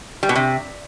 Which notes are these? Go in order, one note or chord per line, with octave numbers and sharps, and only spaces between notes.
G3
B2
C3